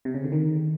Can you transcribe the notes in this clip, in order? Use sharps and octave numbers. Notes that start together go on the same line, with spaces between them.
C3
C#3
D3
D#3